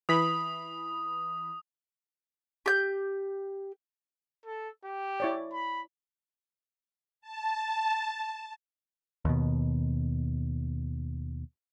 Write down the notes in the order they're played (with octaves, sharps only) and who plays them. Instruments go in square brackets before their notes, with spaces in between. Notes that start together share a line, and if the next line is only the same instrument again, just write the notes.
[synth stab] E3 B5 [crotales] D#6
[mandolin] G4 G6
[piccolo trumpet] A4
G4
[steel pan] E4 C#5 D5
[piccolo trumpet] B5
[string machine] A5
[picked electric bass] D#2 B2